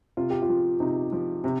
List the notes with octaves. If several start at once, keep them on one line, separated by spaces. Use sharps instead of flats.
C3 F4
G4
F4
F3
C3 D#4
F3
C3